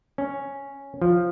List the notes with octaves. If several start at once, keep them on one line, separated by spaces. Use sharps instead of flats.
C#4
F3